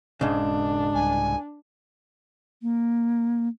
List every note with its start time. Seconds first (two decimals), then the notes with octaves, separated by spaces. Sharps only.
0.21 E1 G#2 C#3 D4
0.95 C2 G#5
2.62 A#3